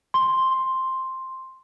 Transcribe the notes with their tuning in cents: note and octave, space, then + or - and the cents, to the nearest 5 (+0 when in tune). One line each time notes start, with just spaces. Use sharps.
C6 +5